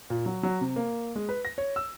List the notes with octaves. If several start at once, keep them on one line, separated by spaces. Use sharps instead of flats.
A#2
F#3
F#3
C3
A#3
G#3
B4
A#6
C#5
E6